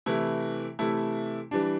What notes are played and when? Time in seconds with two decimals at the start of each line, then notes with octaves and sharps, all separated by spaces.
0.06 C3 E3 A3 E4
0.79 C3 E3 A3 E4
1.51 E3 G3 D4